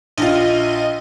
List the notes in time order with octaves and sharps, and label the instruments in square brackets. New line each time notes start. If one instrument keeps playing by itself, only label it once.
[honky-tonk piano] A#1 F4 [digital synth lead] D#5